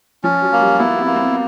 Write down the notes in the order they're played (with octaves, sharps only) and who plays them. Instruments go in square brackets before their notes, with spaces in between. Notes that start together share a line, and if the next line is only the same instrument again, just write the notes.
[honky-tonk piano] F3 [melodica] C#4
[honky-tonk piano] F#3
[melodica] A#3
[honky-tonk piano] G3
[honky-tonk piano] B3 [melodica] E4
[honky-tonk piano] C4
[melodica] A#3
[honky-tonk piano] C4